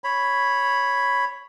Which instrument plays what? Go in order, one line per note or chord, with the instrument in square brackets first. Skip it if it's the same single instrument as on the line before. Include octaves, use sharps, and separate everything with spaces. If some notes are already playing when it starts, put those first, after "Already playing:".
[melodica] C#5 B5